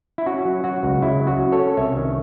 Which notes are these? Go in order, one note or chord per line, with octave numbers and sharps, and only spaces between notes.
E4
C#4 F#4
F#3
F#3 F#4
C#2
C#3 E4
F#3
F#4
C#4
A4 C#5
C#4
C2 C#5 E5
D#3